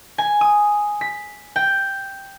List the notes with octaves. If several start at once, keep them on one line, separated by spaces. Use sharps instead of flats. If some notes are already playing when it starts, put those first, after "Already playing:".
G#5
D#6
B6
G5